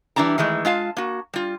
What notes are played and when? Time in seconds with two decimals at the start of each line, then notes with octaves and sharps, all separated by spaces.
0.16 E3 G3 D4 A5 A#5
0.38 D#3 E3 G#3 A3
0.65 G#3 F4 F5 A5
0.97 A#3 F#4
1.34 G3 F4